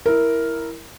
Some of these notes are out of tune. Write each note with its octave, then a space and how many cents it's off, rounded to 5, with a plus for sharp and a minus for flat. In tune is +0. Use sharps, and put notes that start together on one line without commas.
E4 +0 A#4 +0